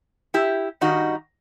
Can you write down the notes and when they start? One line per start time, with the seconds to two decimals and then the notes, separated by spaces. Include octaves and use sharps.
0.34 E4 G4
0.81 G2 D#3 G3 D#4 F#4